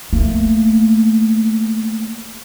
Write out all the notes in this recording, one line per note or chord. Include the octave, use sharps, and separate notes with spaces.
A3 A#3